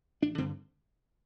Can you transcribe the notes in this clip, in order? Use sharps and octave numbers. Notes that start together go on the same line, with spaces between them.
A1 D4
G2 D3 C4